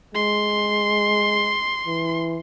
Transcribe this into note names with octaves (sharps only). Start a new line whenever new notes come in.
G#3 C6
E3